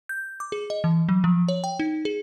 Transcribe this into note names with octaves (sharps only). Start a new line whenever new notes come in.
G6
D6
G#4
D#5
E3
F#3
F3
C#5
G5
D#4
G#4